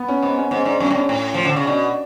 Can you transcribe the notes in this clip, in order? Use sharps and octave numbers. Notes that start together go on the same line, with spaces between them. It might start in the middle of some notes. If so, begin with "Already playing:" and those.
Already playing: B3
C#4
G#2 B3
C#4
G#2 C#4
G#2 D4
F#2 C#4
A2 D4
G#2 C#4
A2
F3
D3
C#3
B2 D4